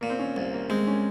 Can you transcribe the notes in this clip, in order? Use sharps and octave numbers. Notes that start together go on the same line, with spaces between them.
A#2 A#3
C4
C#4
C2
A#3
G#3 C4
C#4